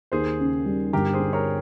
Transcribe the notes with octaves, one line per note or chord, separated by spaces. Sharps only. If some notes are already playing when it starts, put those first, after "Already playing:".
D#2 G#4 C5
C#3
G3
G1 G4 A#4
G#4 C5
G2
A#4 C#5